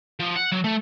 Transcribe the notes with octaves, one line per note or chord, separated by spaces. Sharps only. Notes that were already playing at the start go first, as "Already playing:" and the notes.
F3
F#5
F#3
A3